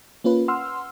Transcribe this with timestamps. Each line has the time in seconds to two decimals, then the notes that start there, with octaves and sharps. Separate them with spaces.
0.24 A#3 C#4 F4 B4
0.48 F#5 C6 E6 F6